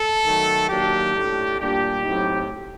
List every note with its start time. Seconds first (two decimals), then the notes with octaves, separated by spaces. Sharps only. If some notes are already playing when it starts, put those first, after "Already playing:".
Already playing: A4
0.24 D#3 F#3 A3
0.69 D#3 F#3 A#3 D4 G4
1.14 A2 A3 D4
1.58 A#2 G3 D4 G4
2.03 A2 F#3 C4 D#4